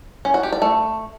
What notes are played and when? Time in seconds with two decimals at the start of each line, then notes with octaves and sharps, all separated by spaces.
0.25 C#4
0.34 F#4
0.43 G4
0.53 D5
0.62 A3